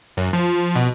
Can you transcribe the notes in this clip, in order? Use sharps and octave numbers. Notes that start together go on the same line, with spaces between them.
F#2
F3
B2